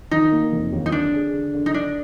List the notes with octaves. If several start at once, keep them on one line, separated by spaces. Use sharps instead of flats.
D#3 D#4
A#3
F1
D#2
D#4
D3 D4
G#4
D3
D3
D#4
D3 D4